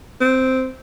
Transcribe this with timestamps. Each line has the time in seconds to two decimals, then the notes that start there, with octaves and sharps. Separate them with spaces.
0.21 C4